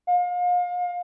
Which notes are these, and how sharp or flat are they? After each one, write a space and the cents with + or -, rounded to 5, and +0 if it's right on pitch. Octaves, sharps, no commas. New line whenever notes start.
F5 +35